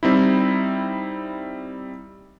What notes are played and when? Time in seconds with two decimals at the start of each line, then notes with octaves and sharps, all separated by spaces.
0.03 G3 C4 D#4 E4